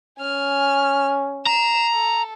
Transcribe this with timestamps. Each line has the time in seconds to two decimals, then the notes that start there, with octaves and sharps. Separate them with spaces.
0.20 C#4 G#5 F6
1.46 A#5 C7 E7
1.92 A4